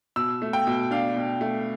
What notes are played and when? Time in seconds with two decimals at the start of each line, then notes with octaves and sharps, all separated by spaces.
0.16 B2 E6
0.42 A3
0.53 G5
0.67 B2
0.91 D4 F5
1.16 B2
1.41 A3